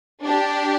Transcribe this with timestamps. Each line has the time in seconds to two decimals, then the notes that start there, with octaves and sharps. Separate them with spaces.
0.24 D4 G4